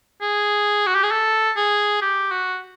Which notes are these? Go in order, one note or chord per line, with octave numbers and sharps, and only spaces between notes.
G#4
F#4
G4
G#4
A4
G#4
G4
F#4